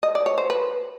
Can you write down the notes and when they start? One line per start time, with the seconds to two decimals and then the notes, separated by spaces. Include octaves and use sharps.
0.03 D#5
0.15 D5
0.26 C#5
0.38 C5
0.50 B4